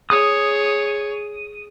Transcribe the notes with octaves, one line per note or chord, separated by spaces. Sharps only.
G#4 C#5 D#6